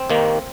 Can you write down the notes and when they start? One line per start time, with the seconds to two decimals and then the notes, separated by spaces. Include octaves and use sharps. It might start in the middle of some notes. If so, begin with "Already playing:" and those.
Already playing: C4
0.10 D#2 D#3 A#3